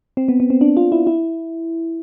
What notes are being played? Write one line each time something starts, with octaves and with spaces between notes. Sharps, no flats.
C4
B3
B3
C4
D4
F4
E4
E4